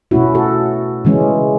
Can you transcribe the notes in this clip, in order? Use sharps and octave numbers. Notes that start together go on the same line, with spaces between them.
B2 A3 C#4 E4 F#4
F#4 A4
C#3 E3 G#3 C#4